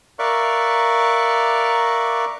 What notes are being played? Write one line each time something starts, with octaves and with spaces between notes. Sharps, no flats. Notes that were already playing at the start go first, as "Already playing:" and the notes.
A#4 D5 E5 F5 C#6 F#6